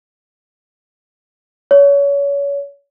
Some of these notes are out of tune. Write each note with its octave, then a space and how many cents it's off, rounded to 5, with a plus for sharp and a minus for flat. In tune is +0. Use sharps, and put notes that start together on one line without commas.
C#5 +30